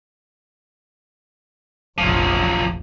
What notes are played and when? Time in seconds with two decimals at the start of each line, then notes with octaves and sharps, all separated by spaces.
1.98 F1 A#1 F3 F#3